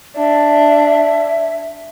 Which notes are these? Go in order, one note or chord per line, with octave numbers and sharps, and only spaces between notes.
D4 E5